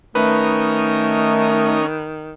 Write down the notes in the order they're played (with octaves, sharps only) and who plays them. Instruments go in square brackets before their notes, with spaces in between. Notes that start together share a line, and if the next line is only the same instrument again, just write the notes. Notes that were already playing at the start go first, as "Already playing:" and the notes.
[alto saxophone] D#3 [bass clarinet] A3 [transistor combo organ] C#4 D#4 A#4 [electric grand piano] B4